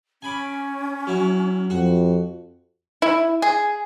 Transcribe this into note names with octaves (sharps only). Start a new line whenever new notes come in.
C#4 G#5 B5 D6
F#3 E4
F2 F#4
E4
G#4